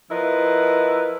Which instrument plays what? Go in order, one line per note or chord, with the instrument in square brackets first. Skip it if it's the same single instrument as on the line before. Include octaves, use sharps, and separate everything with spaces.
[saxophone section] F3 E4 A#4 B4 D#5